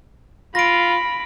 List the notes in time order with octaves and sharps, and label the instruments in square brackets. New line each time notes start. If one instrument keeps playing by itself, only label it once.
[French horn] F4 [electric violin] B5 [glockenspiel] A#6 D7